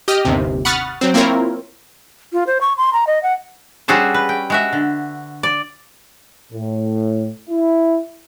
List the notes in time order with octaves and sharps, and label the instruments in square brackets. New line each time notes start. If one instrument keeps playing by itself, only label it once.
[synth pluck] G4 D#5 G5 F6
G1 D#2 C3
F#5 B5 C#6 D#6 F6 A6
F#3 C4
A#3 C4 E4 F4 A#4 C#5
[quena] F4
C5
C#6
C6
A#5
D#5
F#5
[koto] G3 C#4 F#4 G#4 A4 C5
B4
G5
G#3 F#4 E5
D3
D5
[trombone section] A2
E4